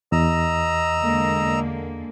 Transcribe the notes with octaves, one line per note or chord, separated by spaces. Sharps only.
E2 D#5 A#5 E6
D3 G#3 A#3